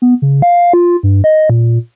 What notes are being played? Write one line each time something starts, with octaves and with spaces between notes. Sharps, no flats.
B3
C#3
F5
F4
G2
D#5
A#2